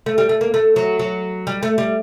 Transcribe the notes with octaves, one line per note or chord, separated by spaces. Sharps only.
A3
G3
A3
A#3
A3
F#3
F#3
G3
A3
G3